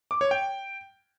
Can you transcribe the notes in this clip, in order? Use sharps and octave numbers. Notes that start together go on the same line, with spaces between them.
D6
C#5
G5